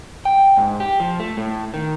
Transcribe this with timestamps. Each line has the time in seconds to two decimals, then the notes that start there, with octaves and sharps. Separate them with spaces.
0.25 G5
0.57 G#2
0.80 G4
1.00 F3
1.20 A3
1.37 A2
1.74 D#3